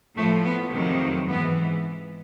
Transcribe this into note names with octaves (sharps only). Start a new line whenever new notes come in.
A2 F3 A3
B3
F2 C3 D#3 F#3
G#2 E3 B3